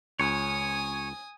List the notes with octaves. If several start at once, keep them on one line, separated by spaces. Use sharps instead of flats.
C#2 C#5 G#5 D#6